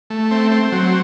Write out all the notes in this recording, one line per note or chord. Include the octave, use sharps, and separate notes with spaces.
A3
C4
C4
F#3